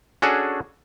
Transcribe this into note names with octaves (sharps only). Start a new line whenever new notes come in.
C#4 D4 F#4 G#4 A4